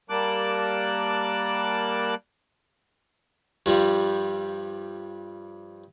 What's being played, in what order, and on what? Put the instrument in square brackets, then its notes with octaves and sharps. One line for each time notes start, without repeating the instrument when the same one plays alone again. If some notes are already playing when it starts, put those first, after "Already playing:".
[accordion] G3 A#3 A5 D6 F#6
[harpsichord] G2 F3 G3